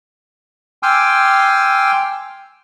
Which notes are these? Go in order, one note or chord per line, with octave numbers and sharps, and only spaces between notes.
G5 G#5 C6 D6 E6 F6